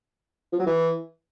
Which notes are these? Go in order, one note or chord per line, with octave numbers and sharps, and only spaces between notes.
F3
F#3
E3